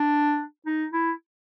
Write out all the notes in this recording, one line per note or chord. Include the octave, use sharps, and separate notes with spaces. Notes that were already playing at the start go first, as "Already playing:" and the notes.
Already playing: D4
D#4
E4